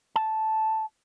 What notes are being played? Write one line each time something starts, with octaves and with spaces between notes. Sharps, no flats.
A5